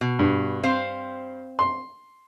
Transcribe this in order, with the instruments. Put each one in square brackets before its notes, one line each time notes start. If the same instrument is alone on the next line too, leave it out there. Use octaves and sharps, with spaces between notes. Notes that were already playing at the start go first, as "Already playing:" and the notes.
[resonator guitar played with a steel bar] B2
[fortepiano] G2
[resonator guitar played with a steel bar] C4 C5 F5
[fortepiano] C6